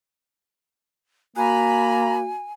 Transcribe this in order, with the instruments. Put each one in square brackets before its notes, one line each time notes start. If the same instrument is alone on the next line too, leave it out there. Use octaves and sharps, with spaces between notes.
[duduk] A#3 [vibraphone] F#4 [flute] G#5 [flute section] A#5 B5